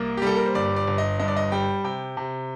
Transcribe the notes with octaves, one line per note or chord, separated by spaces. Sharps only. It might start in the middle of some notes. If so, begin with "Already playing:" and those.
Already playing: C2 A#3
G4
G3 A4
A#4
C5
G1 D5
D5
G1
D#5
G2 D#5
D5
D#5
G3 G5
C3 G5
C3